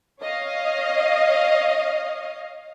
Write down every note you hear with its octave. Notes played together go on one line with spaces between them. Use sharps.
C#5 D#5 F5